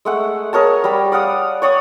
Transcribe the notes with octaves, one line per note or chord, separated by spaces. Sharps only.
G#3 A3 F#5
G#4 A#4 C#5 A5
G3 B5
D5 F5 F#5 D#6
C#5 D5 C#6 D#6